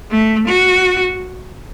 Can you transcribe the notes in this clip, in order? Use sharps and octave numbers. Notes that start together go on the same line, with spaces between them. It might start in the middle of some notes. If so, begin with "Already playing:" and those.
A3
F#4